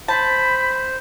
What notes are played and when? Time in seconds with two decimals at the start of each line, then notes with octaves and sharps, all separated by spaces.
0.08 C5 A5 B5